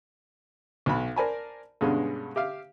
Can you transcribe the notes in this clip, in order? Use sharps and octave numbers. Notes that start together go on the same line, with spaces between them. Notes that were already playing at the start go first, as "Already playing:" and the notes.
B1 F#4 B5
A#4 C5 D5 G#5 A5 B5
G2 B2 D3 G#3 C#4
G4 E5 F5